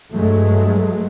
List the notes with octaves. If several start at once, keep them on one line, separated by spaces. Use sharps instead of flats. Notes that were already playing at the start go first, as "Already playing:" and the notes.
G2 F#3 G#3 A3